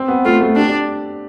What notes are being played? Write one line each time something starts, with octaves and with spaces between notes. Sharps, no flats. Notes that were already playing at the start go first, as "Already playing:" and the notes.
Already playing: C4
B3
A3 F4
A3
D4 G4
D5